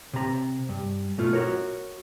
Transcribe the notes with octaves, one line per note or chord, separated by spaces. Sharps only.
C3 A#5
G2
B2 A3 F4
F#4 A#4 C#5